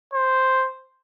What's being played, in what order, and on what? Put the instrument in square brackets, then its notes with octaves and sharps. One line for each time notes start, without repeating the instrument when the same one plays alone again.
[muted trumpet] C5